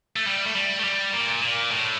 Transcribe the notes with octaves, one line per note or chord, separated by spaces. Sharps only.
A3
G3
A3
G3
A3
G3
A#2
A#2
A2